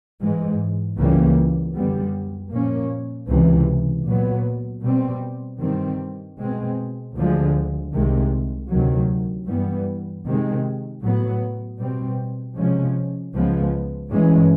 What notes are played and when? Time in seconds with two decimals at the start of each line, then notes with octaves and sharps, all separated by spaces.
0.20 G#2 E3 G#3
0.98 C#2 C#3 E3 G3 A#3
1.75 F#2 D3 G3 B3
2.52 A#2 F3 A#3 C#4
3.29 C#2 C3 E3
4.06 A#2 F#3 B3
4.83 B2 G3 C4
5.61 G2 D#3 G3 C4
6.39 B2 G#3 C4
7.16 D2 D3 F3 G#3
7.93 C2 C3 D#3 G#3
8.69 D2 C3 D#3 F#3
9.47 G2 E3 G3 B3
10.25 C3 D#3 G#3
11.02 A2 F#3 B3
11.79 B2 G3 C4
12.56 C3 F3 G#3 C#4
13.34 C#2 C#3 F3 G#3 B3
14.11 G2 E3 G#3 C#4